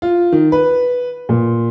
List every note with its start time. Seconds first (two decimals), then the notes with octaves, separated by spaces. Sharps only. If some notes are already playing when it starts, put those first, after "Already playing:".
0.02 F4
0.32 D#3
0.52 B4
1.29 A#2